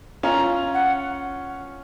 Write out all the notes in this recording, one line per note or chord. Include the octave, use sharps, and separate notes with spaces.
C#4 F4 A#5
F#5